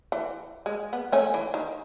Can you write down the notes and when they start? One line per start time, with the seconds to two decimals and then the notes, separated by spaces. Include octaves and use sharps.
0.12 E3
0.66 G#3
0.93 B3
1.12 A3 C#4
1.34 E3
1.54 D#3